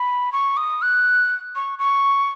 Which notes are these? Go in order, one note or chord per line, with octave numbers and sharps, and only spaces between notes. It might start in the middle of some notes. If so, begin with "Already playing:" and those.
Already playing: B5
C#6
D#6
F#6
C#6
C#6